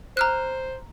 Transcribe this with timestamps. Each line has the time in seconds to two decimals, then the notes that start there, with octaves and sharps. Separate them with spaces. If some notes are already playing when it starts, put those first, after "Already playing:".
0.17 C5 A#5 F6 F#6